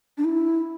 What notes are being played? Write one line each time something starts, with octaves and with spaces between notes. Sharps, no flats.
D4
E4